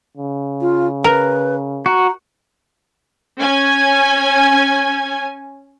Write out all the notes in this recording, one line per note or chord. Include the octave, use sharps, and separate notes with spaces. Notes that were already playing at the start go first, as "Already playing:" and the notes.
C#3
F4
A#4 B4
F#4 A#5
C#4 G#5 G#6